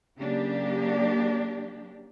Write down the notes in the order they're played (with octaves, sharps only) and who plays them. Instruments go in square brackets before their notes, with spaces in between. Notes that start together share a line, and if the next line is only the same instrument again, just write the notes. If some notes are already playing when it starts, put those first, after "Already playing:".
[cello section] C#3 F#3 A#3 D4 G4